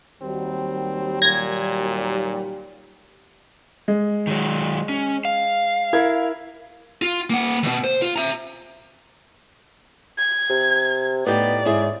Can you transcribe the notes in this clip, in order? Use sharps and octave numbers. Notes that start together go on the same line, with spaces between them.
D#2 F#3 G3 C4
A#2 G#6 A#6
G#3
D#3 F#3
C#4
F5
E4 A#4 G#6
F4
A#3 F#5
D#2 B2
C5
F4
E5 A#5
G#6
C3
A2 B3 D#4 G4 D5
G#2 C#4 E4 G#4